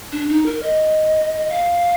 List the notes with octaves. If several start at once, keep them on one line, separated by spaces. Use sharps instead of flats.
D4
D#4
A#4
D#5
F5